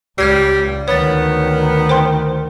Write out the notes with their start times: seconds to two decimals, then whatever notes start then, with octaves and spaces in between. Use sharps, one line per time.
0.18 C#2 G3 F6 G#6 C7
0.88 D2 D#3 B3 C#5 A6
1.89 C5 G5 C6